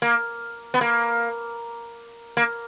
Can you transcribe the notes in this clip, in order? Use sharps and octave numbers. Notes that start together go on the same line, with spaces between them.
A#3
B3
A#3
A#3